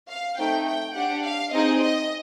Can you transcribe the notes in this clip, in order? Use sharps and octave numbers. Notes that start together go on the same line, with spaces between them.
F5
A3 C4 D#4 G5
G5
D4 G4 F#5
F5
C4 D#4 G#4 D#5
D#5